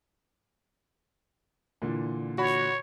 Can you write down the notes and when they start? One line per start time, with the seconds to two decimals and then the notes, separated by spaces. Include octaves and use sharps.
1.82 A#2 D3 E3
2.38 F#4 C#5 B5